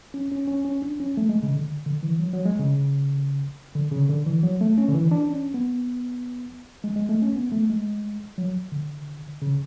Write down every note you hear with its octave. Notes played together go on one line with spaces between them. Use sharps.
C#4
C#4
C#4
C#4
D4
C#4
A3
G#3
C#3
D3
D3
E3
F#3
F#3
G#3
C#3
D3
C#3
D3
E3
F#3
A3
C#4
D3
E3
D4
C#4
B3
G#3
G#3
A3
C#4
B3
A3
G#3
F#3
D3
C#3